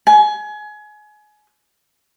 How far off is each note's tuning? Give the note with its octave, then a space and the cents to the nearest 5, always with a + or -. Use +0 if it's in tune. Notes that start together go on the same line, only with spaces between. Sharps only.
G#5 +25